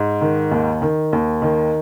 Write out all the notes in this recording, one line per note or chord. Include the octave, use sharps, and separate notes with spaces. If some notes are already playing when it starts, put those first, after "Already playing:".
Already playing: G#2
D#3
D#2
D#3
D#2
D#3